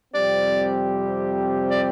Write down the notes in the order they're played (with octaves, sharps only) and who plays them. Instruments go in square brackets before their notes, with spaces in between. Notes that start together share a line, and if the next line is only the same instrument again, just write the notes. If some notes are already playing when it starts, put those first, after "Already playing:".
[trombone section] F2 C3 G3 C4 G4 [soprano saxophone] D5
[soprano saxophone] D5